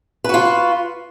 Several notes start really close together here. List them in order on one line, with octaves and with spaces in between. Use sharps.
B4 F#4 F4